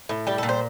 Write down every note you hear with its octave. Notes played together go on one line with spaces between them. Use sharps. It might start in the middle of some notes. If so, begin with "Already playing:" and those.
A2
G3 G4
A#2 A4
C5